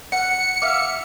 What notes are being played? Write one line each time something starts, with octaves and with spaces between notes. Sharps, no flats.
F#5 C#7
E5 F5 D6